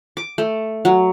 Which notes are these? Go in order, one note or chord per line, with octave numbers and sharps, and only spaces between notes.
D6
A3
F#3